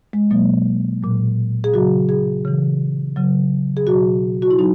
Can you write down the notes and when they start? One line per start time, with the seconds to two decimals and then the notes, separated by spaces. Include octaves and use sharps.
0.13 G#3
0.31 B2 F#3 A#3
1.03 A#2 F#3
1.64 G#4
1.73 C#3 F#3 F#4
2.09 G#4
2.45 C#3 E3
3.16 C#3 F#3
3.77 G#4
3.87 B2 F#3 F#4
4.42 F#4
4.51 E4
4.59 F#3 D#4